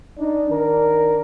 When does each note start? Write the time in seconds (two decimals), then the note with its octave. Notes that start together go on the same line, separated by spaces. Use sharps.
0.19 D4 D#4
0.51 D#3 D4 A#4